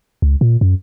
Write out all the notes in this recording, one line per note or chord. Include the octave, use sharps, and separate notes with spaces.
C#2
A#2
F#2